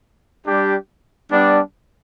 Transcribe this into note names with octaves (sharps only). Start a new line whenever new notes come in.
G3 D4 G4
G3 B3 D4